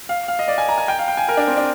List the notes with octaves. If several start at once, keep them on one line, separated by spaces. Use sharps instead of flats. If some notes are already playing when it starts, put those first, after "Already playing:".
F5
F5
D#5
D5
G#5
A#5
G#5
G5
F5
G5
G#5
A#4
D4
C4
D4